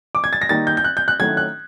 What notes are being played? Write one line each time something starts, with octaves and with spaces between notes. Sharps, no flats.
D6
G#6
A6
A#6
D#3 G3 A#3 D#4 A6
G6
G6
F#6
G6
F#6
D#3 F#3 A3 C#4 E4 G#6
F#6